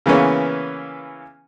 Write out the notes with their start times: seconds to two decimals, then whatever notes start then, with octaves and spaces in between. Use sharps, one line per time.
0.06 C#3 E3 A#3 B3 C#4